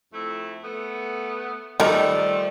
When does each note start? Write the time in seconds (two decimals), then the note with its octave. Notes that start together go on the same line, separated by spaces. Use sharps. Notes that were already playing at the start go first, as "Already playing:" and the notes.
0.14 F2 A3 E4
0.64 A3 B3
1.80 D#3 F3 G3 A3 A#4